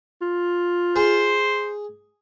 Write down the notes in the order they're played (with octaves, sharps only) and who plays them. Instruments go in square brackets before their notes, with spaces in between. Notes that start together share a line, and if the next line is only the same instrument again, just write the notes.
[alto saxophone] F4
[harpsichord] G#4 [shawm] C5